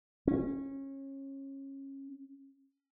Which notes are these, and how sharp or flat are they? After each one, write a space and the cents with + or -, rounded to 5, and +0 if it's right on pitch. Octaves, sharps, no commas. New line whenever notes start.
C#4 -25